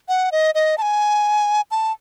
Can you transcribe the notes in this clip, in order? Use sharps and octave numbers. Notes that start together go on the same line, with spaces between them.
F#5
D#5
D#5
A5
G#5
A5